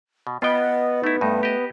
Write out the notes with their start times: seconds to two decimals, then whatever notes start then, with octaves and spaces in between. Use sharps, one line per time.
0.27 B2
0.42 B3 F4 D#5 G5
1.04 A3 D#4 E4
1.21 G2 A3 D#4
1.43 G4 D#5